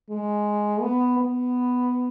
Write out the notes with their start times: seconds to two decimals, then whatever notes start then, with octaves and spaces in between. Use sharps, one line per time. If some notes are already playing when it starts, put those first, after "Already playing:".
0.10 G#3
0.81 B3
1.18 B3